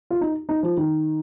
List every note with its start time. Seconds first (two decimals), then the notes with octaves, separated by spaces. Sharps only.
0.11 F4
0.21 D#4
0.49 D#4
0.63 F3
0.77 D#3